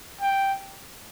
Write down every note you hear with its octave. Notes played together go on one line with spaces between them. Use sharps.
G5